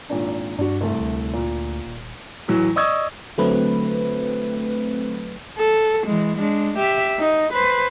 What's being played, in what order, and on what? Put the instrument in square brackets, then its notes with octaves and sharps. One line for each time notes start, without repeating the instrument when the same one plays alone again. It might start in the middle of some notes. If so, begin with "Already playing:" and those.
[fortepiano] G#1 A#2 D4
[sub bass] G2 [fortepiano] D4 F#4
[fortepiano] C2 A3
[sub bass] D2
[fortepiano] A#2
[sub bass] D#1
[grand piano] A2 E3 F#3
D5 D#5 C#6 D#6 E6 G#6
[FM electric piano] D3 F#3 A3 C4 B4
[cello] A4
E3 G#3
G#3 D4
G4 E5
D#4
B4 C5